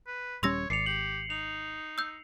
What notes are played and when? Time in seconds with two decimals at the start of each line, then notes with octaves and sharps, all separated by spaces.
0.07 B4
0.43 D#1 G3 C#4 C#5 C6 E6 A#6
0.70 G#1 D5 C7 C#7 F7
0.86 G4 F#7
1.30 D#4 F7
1.98 E6 G6